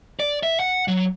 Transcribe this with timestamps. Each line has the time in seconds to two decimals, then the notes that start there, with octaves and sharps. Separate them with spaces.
0.20 D5
0.43 E5
0.60 F#5
0.88 F#3